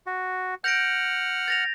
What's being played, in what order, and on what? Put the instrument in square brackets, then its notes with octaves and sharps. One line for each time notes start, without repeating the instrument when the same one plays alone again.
[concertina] F#4
[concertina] F#5 F6 [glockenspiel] G6 A#6 D7
[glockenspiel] A6 A#6 F7